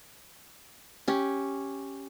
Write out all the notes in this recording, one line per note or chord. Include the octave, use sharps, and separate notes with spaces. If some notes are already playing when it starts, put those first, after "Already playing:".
C#4 G4